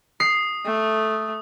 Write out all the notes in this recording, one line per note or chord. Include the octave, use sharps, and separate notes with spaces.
D#6 C7
A3